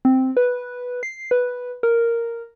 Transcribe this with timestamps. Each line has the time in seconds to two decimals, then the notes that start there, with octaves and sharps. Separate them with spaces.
0.05 C4
0.37 B4
1.03 C7
1.31 B4
1.83 A#4